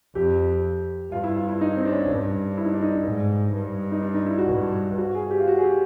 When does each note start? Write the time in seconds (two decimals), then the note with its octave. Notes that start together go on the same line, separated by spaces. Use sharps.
0.15 F2 G4
1.12 G2 F4
1.24 E4
1.37 F4
1.49 E4
1.61 D#4
1.76 C4
1.85 D4
1.92 C#4
2.08 G2 D4
2.57 E4
2.66 D#4
2.74 D4
2.82 D#4
3.06 G#2
3.54 G2
3.92 D#4
4.02 D4
4.14 D#4
4.26 E4
4.38 F#4
4.50 G2
4.98 F#4
5.15 G#4
5.31 G4
5.40 F4
5.47 F#4
5.58 G#4
5.64 G4